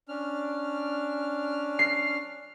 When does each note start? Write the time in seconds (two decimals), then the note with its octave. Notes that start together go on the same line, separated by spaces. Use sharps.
0.09 C#4 D4 F6
1.79 C7